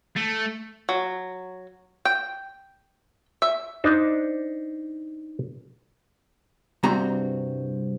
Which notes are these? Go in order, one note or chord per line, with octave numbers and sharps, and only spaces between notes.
A3
F#3
G5
E5
D4 D#4 C5
C2 G2 C4 F#4 A#5